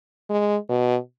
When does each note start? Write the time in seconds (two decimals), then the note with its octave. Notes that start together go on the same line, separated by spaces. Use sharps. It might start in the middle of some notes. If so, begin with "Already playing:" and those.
0.30 G#3
0.69 B2